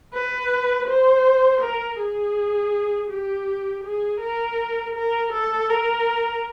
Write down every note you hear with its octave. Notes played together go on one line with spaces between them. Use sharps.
B4
C5
A#4
G#4
G4
G#4
A#4
A#4
A4
A#4